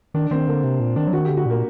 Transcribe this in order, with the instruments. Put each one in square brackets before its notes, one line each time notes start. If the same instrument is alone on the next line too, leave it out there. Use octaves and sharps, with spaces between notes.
[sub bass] D#3 [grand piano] D4
[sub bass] D#3 [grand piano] C4
[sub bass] D3 [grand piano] A#3
[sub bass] C3
A#2
[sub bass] D#3 [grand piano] D4
[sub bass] F#3
[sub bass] D#3 [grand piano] F#4
[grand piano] G4
[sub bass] D3
[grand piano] F#4
[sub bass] A#2 [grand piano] A#3